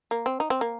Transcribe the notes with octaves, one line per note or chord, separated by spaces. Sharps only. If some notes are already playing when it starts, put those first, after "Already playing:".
A#3
C4
D#4
C4
A#3